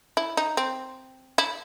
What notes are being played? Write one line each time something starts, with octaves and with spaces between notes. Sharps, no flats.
E4
D#4
C4
E4